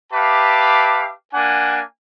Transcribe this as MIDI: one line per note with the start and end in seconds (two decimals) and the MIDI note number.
0.13 1.12 67
0.13 1.12 71
0.13 1.12 76
0.13 1.12 77
0.13 1.12 81
0.13 1.12 86
1.33 1.80 58
1.33 1.80 62
1.33 1.80 78
1.33 1.80 80